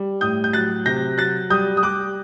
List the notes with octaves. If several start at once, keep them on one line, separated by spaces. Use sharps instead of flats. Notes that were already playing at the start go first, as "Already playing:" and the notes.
Already playing: G3
A2 D#6 G6
G6
F#3 F#6 A6
C3 G6 A#6
F#3 F#6 A6
G3 D#6 G6
D#6
G3 D6 F#6